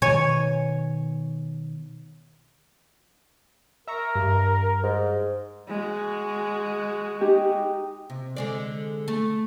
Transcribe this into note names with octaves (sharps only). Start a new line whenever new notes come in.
B2 D#3 C#5 G#5
A#4 E5 A#5 C#6
G2
G#2
G#3 F#4
D#4 G4
C3
D3 G#3 D5
A3